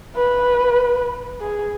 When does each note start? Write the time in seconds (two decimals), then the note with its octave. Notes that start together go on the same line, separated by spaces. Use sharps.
0.16 B4
1.40 G#4